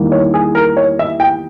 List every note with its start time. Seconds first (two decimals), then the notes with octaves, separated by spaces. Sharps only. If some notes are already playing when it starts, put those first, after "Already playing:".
Already playing: E2 D#3 G3 A#3 E4
0.12 C#5
0.34 G#4
0.55 A#4
0.77 C#5
0.99 E5
1.20 G5